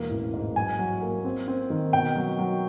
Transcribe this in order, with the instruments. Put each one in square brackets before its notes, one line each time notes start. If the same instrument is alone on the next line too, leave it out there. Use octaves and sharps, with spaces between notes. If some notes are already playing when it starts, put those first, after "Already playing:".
Already playing: [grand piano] E1 A#3
A1
G#2
F#3 G#5
F#3
A#3
C4
C4
D#3
B2 G5
F#3
F#3